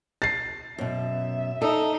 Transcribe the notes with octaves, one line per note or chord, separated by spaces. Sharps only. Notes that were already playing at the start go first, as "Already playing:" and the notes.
A6 C7
F#2 B2 E5
D#4 A4